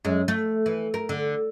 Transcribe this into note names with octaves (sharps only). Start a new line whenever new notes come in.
F#2 G#3
A3
E3
A#4
D3